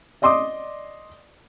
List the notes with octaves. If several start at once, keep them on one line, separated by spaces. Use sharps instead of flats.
D5 D#5 C6 D6 D#6